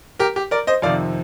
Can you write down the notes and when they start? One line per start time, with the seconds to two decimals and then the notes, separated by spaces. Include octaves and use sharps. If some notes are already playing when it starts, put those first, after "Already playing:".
0.19 G4 A#4
0.36 G4
0.51 A#4 D5
0.67 C5 D#5
0.82 F2 C3 D#3 D5 F5